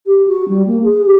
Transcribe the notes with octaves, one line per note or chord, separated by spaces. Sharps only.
G4
F#4
G3
A#3
G#4
G4